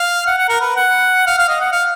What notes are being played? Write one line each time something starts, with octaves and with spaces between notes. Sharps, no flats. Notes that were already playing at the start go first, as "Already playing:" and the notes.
Already playing: F5
F#5
F#5
A#4
B4
F#5
F5
F5
D#5
F#5
F5